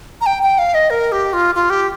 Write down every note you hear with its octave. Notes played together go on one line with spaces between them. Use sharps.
A#5
G5
G5
F5
D#5
A#4
G4
F4
F4
G4